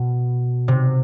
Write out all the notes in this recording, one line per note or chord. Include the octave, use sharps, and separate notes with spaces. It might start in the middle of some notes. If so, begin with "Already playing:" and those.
Already playing: B2
C3